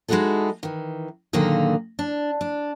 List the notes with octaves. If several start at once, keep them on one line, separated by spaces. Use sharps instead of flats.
G#3 D#4 E4 F#4 G#4 A4
D#3 E3
A#2 D3 D#3 F#3 A#3 G#4
D4
D4